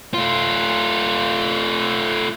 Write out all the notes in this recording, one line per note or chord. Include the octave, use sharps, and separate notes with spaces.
A3 F4